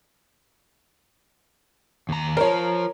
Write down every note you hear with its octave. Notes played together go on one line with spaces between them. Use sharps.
D#2 A#5
F4 A#4 C5 C#5